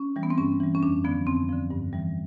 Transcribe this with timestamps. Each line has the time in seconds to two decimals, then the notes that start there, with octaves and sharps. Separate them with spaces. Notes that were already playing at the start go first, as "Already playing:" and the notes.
Already playing: C#4
0.16 E3 G3
0.23 B3
0.30 C4
0.38 G2 C#4
0.60 E3 G3
0.75 C#4
0.82 F2 D4
1.04 D3 F3 B3
1.27 F2 C4
1.49 D3 F3
1.71 G2
1.93 E3 G3